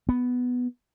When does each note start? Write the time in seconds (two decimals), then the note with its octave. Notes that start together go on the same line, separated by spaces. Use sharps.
0.09 B3